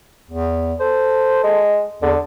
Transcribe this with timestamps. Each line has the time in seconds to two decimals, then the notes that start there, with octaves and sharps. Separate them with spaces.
0.31 E2
0.80 A4 C5
1.44 G#3
2.02 E2 D3